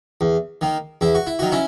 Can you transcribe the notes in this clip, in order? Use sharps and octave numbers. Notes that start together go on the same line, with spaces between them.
E2
D#3 A#3
E2 E4
F#4
E4
D#3 F#3 F#4
C#4 E4